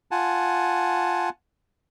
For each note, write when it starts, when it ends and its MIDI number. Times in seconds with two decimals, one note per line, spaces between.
0.11 1.29 65
0.11 1.29 78
0.11 1.29 80
0.11 1.29 81